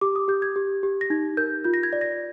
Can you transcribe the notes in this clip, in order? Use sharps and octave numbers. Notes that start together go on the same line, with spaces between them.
G4 D6
D#6
G4 G6
G#6
G4
G4
A#6
D#4 G#6
A#4 G6
F4 G6
A#6
G#6
D5
A#6